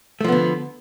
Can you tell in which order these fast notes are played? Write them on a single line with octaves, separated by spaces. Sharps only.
A3 F3 B3 D3